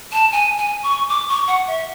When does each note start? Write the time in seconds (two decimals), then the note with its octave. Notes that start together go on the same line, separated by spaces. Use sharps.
0.13 A5
0.32 G#5
0.58 G#5
0.83 C#6
1.09 D6
1.28 C#6
1.48 F#5
1.67 E5